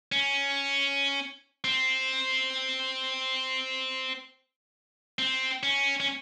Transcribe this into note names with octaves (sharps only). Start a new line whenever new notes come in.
C#4
C4
C4
C#4
C#4